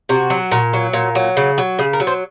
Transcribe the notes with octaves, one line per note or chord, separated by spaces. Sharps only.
C3 F#4
F#3
A#2
F#3
A#2
F#3
C#3
F#3
C#3 G#4
A#4
F#3
C5